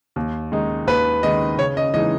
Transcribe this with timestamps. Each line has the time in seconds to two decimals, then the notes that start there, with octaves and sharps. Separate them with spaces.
0.16 D#2
0.52 D#3 G#3 D#4
0.87 D#2 B4
1.23 D#3 G#3 D#4 D#5
1.58 C#3 C#5
1.77 D#5
1.94 E3 G#3 D#4 D#5